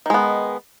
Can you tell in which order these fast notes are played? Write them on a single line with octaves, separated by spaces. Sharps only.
D#3 G#3 B3